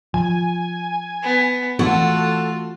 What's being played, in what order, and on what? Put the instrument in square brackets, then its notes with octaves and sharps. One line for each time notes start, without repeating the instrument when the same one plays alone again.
[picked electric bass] F3 [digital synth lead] G#5
[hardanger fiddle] B3
[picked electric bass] E3 A3 C4 [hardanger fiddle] F4 [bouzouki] F#4 [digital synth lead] A4